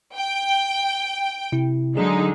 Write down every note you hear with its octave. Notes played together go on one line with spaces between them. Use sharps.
G5
C3 E4
D3 F#3 G#3 D4 D#4 G#4